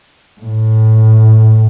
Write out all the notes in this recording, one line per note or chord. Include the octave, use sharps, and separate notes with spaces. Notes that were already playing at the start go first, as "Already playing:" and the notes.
A2